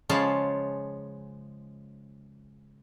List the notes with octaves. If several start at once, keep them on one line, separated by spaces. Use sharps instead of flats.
C#3 F3 G#3 F4 C#5 A5